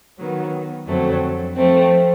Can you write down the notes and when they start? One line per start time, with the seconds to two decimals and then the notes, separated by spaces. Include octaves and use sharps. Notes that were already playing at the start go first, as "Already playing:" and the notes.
0.19 D#3 F#3 B3
0.88 F2 D3 F#3 A3 C4
1.56 F3 A3 C4